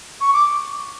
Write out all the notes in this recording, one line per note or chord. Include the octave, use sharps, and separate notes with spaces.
C#6
D6